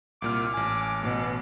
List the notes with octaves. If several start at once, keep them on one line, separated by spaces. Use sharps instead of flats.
C2 A#2 D6 F6
A1 G#5
B2